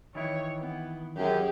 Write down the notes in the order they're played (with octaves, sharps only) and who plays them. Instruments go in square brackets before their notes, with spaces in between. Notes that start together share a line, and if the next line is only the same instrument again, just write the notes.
[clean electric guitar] D#3 E3 E4 [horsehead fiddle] C#5
[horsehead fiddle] B3
[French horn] F#2 [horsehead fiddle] G4 G#4